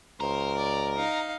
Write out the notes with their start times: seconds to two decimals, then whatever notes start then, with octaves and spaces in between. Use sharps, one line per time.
0.20 C#2 A#4 C5
0.57 D5
0.96 D#4 F5